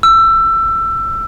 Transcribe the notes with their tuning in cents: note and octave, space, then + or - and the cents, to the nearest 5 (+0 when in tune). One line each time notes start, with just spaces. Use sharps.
E6 +20